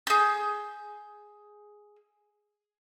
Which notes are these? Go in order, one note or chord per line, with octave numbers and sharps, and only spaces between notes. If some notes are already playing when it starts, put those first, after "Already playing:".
G#4 G6